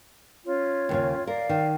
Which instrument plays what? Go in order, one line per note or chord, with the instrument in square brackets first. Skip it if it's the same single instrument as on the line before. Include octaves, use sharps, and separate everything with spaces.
[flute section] C#4 F4 C#5
[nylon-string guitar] D#2 A#2 C#3
[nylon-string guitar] A#4 [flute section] D5 F5
[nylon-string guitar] D#3